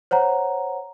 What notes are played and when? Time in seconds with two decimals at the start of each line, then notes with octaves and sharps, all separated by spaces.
0.11 C5 C#5 F#5 A#5